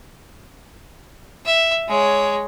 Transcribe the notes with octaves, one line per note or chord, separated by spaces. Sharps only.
E5
G#3 C#5